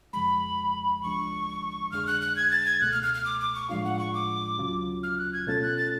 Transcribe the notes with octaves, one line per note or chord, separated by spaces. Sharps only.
F2 C#3 F3 G#3 B5
C#2 C#3 F3 G#3 D4 C#6
F2 D3 G#3 D4 G#4 F6
F#6
F#6
G#6
A6
G#6
C#2 B2 A3 F#6
F6
F6
F6
D6
D6
C#6
A2 F3 G#3 D4 F4 F5
F#5
C#6
D6
D2 C#3 F#3 C#4 F4
F6
F#6
G#6
B2 A3 C#4 F4 A4 A6
F#6
A6